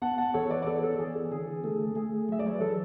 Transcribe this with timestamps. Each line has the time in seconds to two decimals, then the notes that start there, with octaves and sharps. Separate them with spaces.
0.02 B3 F#5 A5
0.18 F#5 A5
0.34 E3 A4 C#5
0.50 B4 D5
0.62 D5
0.66 B3 A4 C#5
0.83 A4
0.99 E3 G#4
1.15 A4
1.31 D3 G#4
1.64 A3 A4
1.95 A3 G#4
2.29 F#3 E5
2.39 D5
2.46 C#5
2.54 B4
2.61 E3 A4